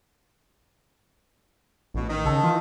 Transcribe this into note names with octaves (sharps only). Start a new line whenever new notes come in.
A1 B2
D#3
C#3 A4
E3 F4